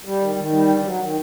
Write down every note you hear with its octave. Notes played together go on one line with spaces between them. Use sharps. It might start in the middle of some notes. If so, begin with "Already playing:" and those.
G3
D#3
D#3
G3
G2
F#3
D#3